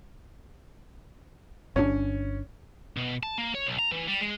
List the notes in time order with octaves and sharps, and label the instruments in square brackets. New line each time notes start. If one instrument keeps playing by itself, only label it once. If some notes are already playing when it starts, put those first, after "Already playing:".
[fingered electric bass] G1 A#2 D4 [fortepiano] C#4
[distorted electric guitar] B2
A5
A#3
C#5
B1
A#5
E3
G3
G#3